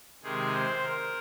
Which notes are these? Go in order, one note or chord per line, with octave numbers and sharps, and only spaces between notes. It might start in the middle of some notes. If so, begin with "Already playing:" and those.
C3 D#3 G#3 G#4
C5
A#4